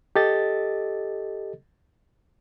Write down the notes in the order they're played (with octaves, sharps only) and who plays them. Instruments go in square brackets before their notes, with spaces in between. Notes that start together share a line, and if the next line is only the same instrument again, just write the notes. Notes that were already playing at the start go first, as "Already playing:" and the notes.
[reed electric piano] G4 A4 D#5 A6